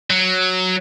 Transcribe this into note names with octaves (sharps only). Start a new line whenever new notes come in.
F#3